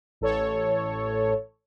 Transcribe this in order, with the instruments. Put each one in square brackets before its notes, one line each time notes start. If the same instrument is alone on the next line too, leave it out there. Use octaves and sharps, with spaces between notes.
[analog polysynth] A1 A4 C#5